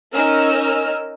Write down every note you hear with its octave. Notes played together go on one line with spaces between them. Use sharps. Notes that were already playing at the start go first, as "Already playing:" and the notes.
C#4 D#4 A#4 D#5 E6 F6